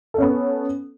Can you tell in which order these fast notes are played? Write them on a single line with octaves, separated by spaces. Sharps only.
A4 C#4 B3